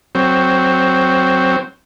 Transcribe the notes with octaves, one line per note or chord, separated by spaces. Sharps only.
F#3 C4